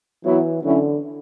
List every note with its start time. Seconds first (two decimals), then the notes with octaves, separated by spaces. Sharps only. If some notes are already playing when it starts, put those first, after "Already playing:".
0.24 E3 F#3 B3 E4
0.63 D3 F#3 C#4 E4